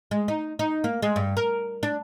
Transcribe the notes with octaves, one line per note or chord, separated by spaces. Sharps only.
G#3
D#4
D#4
A#3
G#3
G2
A#4
D4